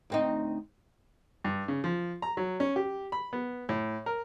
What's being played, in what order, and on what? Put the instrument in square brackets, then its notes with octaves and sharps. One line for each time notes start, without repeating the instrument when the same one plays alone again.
[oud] D2 C4 D#4
[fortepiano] G2
C#3
F3
A#5
F#3
C#4
G4
B5
B3
A2
A#4